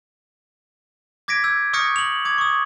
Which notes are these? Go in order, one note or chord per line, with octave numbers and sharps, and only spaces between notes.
D6 G#6 A#6 B6 D7
E6 G6 G#6
C#6 D#6 F6 G6 A#6 C#7
F7 F#7
D6 G#6
C#6 D#6